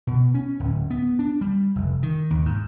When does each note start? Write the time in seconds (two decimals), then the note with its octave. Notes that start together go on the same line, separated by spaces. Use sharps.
0.07 B2
0.34 C#4
0.60 D1
0.90 B3
1.19 D4
1.41 G3
1.76 F1
2.03 D#3
2.31 D#2
2.46 G#2